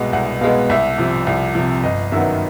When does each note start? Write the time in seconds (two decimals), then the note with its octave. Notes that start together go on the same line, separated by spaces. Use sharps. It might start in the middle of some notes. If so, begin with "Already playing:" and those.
Already playing: C2 B2 G#3 B3
0.13 C2 F#5
0.41 B2 G#3 B3 F5
0.70 C2 E5
0.98 C3 F3
1.27 C2
1.55 C3 F3
1.83 G1 D#5
2.12 F#2 D#3 F#3 B3 E5